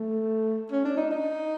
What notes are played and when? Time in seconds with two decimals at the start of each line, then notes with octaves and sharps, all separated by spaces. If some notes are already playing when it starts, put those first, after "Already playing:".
Already playing: A3
0.72 C#4
0.85 D4
0.97 D#4
1.11 D#4